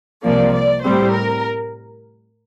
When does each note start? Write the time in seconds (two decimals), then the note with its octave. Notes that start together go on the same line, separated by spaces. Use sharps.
0.23 C2 C3 F3 A#3 D5
0.54 D5
0.83 A2 G3 C4 C5
1.12 A#4